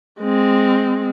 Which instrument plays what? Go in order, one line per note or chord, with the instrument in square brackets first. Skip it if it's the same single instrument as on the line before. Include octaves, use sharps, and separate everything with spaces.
[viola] G#3 C4